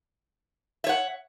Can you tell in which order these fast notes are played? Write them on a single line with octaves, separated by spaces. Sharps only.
E5 C#5 F#5